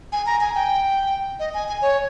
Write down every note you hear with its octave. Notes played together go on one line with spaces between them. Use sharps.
G#5
A#5
G#5
G5
D#5
G#5
G#5
C#5